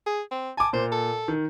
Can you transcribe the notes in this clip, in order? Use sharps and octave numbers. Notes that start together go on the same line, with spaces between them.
G#4
C4
G#5 A5 D6
A#2 C5
A4
D#3